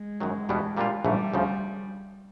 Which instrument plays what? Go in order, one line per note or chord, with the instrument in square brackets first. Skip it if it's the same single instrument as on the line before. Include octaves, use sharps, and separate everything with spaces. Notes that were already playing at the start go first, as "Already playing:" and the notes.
Already playing: [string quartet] G#3
[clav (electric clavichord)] F#2 D#3 F#3
E2 B2 G3 B3 D4
A#2 G3 A#3 D4 F4
[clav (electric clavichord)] A#1 G#2 E3 A3 [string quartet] G3
[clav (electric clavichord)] D2 C#3 F3